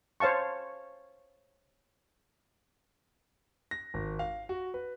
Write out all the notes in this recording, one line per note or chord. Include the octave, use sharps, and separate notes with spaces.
C5 C#5 F5 A5 C#6
A#6
G#1
F5
F#4
B4